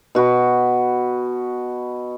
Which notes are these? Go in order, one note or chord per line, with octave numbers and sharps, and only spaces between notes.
B2 F#4 B4